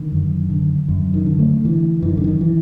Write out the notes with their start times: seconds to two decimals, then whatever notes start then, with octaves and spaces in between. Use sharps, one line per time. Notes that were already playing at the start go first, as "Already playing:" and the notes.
Already playing: D3 D#3
0.12 F#2
0.50 D3
0.88 F#2
1.14 D#3
1.26 D3
1.39 A3
1.64 D3 E3
2.02 F#2 E3
2.09 D#3
2.17 D3
2.24 D#3
2.41 E3